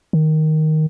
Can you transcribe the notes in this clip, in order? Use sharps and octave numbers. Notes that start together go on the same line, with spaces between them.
D#3